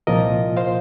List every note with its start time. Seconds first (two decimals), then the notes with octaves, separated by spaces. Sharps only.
0.07 C2 A#2 F3 A#3 F4 A#4 D#5
0.57 C5 F5